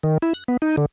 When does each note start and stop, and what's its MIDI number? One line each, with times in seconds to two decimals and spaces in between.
0.03 0.18 51
0.22 0.33 64
0.34 0.44 90
0.48 0.57 59
0.62 0.76 63
0.77 0.86 50